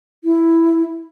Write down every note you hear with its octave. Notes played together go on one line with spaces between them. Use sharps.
E4